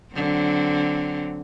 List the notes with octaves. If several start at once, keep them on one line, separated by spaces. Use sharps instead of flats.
D3 F#3 C4